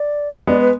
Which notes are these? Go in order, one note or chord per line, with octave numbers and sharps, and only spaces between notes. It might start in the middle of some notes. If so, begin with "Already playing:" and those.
Already playing: D5
G#3 B3 D5
B4